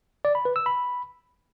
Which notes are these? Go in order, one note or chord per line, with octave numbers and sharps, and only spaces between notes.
D5
B5
B4
E6
B5